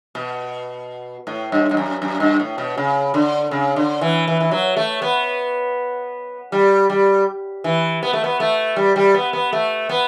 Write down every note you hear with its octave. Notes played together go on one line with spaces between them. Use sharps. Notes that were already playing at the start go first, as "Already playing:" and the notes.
B2
A2
G2
G2
F#2
F#2
G2
A2
B2
C#3
D3
C#3
D3
E3
E3
E3
F#3
A3
B3
G3
G3
E3
B3
A3
B3
A3
G3
G3
B3
B3
A3
B3